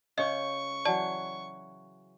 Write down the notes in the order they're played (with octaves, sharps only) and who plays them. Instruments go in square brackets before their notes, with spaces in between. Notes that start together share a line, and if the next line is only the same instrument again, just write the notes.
[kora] C#3 C#5 G5 [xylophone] D#5 [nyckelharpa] C#6
[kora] E3 F#3 [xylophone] D5 A5